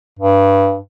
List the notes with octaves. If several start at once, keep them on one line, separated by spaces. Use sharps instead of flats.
G2